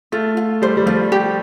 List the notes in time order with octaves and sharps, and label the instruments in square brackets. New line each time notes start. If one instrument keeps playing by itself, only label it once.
[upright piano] A3 [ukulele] F4
[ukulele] F4
[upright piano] G3 [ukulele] C5
[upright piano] G3
[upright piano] F3 [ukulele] F4
[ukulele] G4